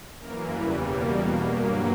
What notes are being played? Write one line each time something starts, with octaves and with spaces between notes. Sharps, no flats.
F#2 E3 A#3 A#4
E2 C#3 E3 G3 B4
B2 G3 A#3 C#5
E2 B2 A#3 F#4
G2 F#3 A#3 G4